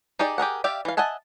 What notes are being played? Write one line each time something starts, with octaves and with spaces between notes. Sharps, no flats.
D#4 G4 G#4 D5
G4 G#4 A#4 F#5
G4 D5 E5 F5 G5
E3 F5
D#5 E5 F#5 G#5 A5